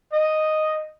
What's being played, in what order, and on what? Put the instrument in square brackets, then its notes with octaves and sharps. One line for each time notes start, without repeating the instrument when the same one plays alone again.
[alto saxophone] D#5